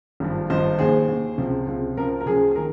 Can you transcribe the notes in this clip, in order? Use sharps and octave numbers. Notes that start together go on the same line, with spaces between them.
G#1 G2 F3
G#1 G2 F3 C5 D#5
D#2 D#3 G#4 C5
D#2 D#3
C#2 C3 F3
C#2 C3 F3
C#2 C#3 F3 A#4
A#4
C#2 C#3 F3 G#4
G#4
D#3 A#4